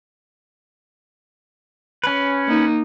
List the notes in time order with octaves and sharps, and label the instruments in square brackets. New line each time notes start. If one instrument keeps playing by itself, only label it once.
[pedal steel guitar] C#4 B4
[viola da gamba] A#3 D#4